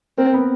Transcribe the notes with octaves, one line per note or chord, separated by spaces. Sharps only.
A#3 C4 A#4
B3 B4